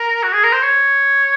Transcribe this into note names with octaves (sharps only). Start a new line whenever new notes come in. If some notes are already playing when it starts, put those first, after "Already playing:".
Already playing: A#4
F#4
G#4
A#4
C5
C#5